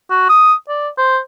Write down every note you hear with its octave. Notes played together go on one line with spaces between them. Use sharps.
F#4
D#6
D5
C5